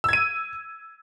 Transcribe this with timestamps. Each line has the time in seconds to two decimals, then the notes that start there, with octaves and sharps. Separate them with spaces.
0.04 E6
0.09 G#6
0.13 D#7